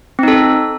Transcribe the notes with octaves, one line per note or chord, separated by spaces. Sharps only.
C4 D#4 A4